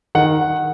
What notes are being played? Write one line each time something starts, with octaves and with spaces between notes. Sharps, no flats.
D#3 F#5